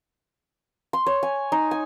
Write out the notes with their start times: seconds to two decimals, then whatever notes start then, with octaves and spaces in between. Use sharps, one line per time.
0.93 C6
1.07 C#5
1.23 G#5
1.52 D#4
1.71 G#5